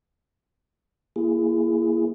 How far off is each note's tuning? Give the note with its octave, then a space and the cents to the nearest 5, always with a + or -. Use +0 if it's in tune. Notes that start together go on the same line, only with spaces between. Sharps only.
A#3 +0 E4 +30 G#4 +0